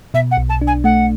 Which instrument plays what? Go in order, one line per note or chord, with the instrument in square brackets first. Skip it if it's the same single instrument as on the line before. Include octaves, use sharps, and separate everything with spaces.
[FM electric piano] B2 [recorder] E5
[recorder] F#5
[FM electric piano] B1
[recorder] A5
[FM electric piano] D4
[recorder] G#5
[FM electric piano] A3 [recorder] F#5